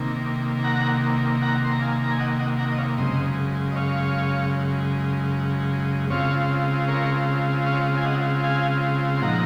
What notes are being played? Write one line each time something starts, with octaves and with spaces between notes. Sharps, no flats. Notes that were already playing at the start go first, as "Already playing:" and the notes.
Already playing: C3 D#3 A#3
F#5 A#5
F#5 A#5
C6
A#5
F5 G#5
A#5
G#5
D#5 F#5
D#5 F#5
F#5 A#5
D#5
C#5 F5
F#2 C#3 G#3 C5 D#5
D#5
C#5 F5
C#3 G#3 C4 F4 C#5 F5
A#4 C#5
C#5 F5
G#5
D#5 F#5
F5 G#5
C6
A#2 F3 C4 D#4 F#5 A#5